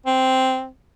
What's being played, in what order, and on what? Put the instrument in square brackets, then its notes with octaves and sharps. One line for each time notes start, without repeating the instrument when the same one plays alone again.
[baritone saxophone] C4